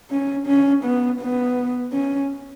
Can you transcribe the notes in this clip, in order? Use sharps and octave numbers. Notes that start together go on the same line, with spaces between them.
C#4
C#4
B3
B3
C#4